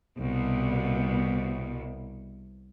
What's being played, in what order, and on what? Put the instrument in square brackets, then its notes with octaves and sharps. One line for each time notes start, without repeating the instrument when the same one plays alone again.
[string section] C2 B2